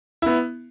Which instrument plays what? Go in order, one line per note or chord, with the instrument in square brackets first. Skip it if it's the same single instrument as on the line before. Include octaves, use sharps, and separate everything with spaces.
[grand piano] B3 E4